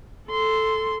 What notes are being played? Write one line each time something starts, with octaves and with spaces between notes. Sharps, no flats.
A4 C6